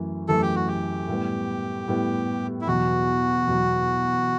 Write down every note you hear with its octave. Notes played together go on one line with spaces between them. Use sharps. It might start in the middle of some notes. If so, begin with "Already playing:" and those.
Already playing: F#2 E3 A3
F#2 E3 A3 A4
G4
F#4
G4
A2 G3 B3
A2 G3 B3
E4
E2 B2 F#3 F#4
E2 B2 F#3